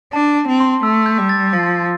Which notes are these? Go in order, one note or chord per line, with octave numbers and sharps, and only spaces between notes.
D4 A5
C4
C6
A3 E6
G6
G3
A6
F3 A6